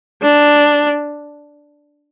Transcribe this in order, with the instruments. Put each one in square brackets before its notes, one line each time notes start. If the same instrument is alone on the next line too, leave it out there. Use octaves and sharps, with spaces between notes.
[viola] D4